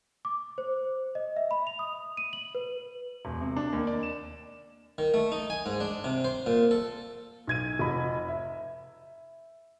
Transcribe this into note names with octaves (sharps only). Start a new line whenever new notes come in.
D6
C5
D#5
E5
B5
F7
D#6
D#7
F#7
B4
E1
C3
D4
D#2
D5
E7
D#3
A3
D#4
G#5
G#2
D4
C3
C5
A#2
A4
B1 G#6 D#7
F1 D#5 B5
E5